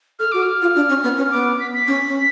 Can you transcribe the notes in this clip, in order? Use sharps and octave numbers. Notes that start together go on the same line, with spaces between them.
A4 F6
F#4 D6
F6
F4
D4
C#4
B3
C#4
F6
B3 D6
B6
B6
C#4
C#4